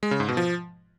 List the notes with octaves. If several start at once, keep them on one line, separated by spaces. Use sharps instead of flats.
G#3
C#3
G#2
B2
F3